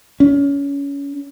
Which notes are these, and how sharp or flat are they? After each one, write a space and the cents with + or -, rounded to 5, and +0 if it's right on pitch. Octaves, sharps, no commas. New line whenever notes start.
C#4 +25